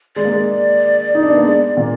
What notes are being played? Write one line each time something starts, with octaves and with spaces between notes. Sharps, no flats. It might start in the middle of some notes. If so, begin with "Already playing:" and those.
G#3 D5
A#3
G#3
D#4
D4
B3
A#3
G#3
A#2 A#3